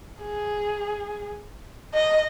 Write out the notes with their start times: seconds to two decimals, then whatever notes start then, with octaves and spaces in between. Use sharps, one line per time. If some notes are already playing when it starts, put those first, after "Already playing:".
0.21 G#4
1.94 D#5